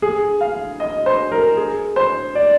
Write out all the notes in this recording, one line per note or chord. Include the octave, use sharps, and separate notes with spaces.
G#4
F5
D#5
C5
A#4
G#4
C5
D5